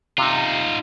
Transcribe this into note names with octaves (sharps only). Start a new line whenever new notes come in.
C3 D#4 F4